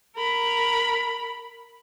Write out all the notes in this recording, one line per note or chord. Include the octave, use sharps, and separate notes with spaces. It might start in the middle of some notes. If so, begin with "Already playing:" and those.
A#4 B5